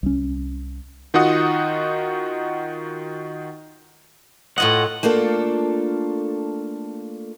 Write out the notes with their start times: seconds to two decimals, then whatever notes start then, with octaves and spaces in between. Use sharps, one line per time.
0.03 C2 C#4
1.14 D#3 D#4 F4 F#4 F#5 D#6
4.58 A2 F4 D#5 F#5
5.03 A3 A#3 D4 F4 A4